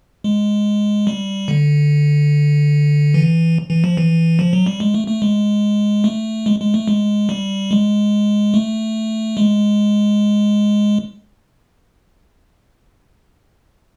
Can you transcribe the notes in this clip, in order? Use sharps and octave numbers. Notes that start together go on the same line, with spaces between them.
G#3
G3
D3
E3
E3
F3
E3
F3
F#3
G3
G#3
A3
A3
G#3
A3
G#3
G#3
A3
G#3
G3
G#3
A3
G#3